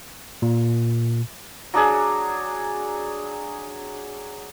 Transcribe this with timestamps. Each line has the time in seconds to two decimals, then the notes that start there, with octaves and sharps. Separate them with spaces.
0.42 A#2
1.74 F#3 D4 G#4